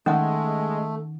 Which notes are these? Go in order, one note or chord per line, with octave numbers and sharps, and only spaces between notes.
D#3 G#3 A3 C#4 F#5